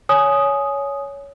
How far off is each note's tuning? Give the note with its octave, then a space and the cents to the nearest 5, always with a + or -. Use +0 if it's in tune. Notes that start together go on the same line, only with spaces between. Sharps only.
C#5 +15 G#5 +15 D#6 +0